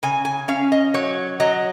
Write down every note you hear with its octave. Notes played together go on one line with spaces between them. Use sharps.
C#3 G#5
G#5
C#4 F5
D#5
F#3 C#5
F#3 D#5